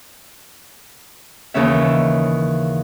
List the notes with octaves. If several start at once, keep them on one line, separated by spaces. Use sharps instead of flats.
D#2 C#3 E3 C#4 E5